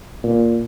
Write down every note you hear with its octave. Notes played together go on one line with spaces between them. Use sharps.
A#2